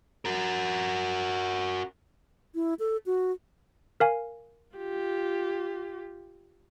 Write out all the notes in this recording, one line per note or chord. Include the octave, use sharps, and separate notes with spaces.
F#4 A#4
E4
A4
F#4
A#4 F5 G#5
F4 G4